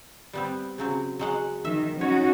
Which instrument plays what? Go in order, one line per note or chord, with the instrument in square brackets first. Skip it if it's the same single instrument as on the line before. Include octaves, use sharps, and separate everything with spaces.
[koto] G3 B3 C4
C#3 F#3 C4
F#3 G#3 F#5
[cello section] D#3 [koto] E5
[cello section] C#4 D#4 F#4 [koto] C#5